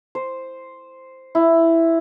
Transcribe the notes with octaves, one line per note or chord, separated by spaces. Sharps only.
C5
E4